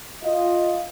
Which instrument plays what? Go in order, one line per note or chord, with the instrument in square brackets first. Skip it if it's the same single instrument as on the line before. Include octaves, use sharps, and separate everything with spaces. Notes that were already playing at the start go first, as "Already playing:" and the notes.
[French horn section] F4 D#5